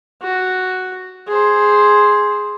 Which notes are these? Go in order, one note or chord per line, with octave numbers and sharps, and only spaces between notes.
F#4
G#4 C5